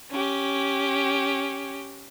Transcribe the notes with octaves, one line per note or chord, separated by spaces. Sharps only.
C#4 G4